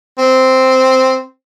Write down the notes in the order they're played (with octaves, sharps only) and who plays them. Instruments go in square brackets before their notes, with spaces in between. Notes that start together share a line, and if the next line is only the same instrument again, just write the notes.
[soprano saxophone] C4